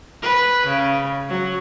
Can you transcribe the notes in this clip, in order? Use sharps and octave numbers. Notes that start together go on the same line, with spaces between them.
B4
C#3
F#3